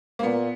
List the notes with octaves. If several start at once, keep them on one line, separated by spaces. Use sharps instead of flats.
A#3
A#2 B3